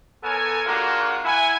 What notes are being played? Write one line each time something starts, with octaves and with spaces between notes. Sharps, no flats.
B3 A4 A#4 C#5 G#5
G#3 A#3 D4 F4 F#4
E4 F#5 G#5